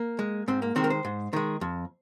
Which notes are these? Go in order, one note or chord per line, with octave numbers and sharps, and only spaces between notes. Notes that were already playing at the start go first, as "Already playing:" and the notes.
Already playing: A#3
G#3
G#2 C4
A#3
D#3 G#3 C4
A#4
C5
G#2
D#3 G#3
F2